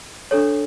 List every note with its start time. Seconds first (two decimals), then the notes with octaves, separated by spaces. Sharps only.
0.31 D4 A4 C#5